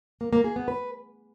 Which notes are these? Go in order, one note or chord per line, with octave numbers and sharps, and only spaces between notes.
A#3
A#3
G#4
B3
B4